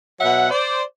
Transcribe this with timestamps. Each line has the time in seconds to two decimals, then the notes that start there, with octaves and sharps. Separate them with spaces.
0.20 B2 F#3 E5 F#5
0.50 C5 D5